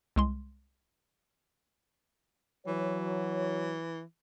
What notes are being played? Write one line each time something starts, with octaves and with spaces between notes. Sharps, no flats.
C2 G#3 C6
E3 F#3 C#5